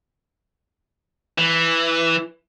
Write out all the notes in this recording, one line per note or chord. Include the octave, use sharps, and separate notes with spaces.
E3